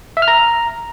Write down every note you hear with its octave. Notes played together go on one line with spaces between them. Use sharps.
E5
F6
A#5